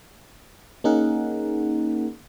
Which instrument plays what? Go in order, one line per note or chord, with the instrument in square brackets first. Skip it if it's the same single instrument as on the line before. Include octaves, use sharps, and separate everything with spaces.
[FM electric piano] A#3 C#4 D#4 G#4 A#4 F#5